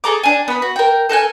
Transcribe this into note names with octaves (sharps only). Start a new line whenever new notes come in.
G#4 A4 A#5 D6
D4 G#5
B3 B5
F#4
A#4 G5
A4 A#4 F#5 G#5